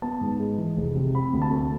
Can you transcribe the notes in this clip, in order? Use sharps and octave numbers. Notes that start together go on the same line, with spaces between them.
B3 A5
G#2
G#3
E3
F1
C3
C4 B5
D2
A5
A3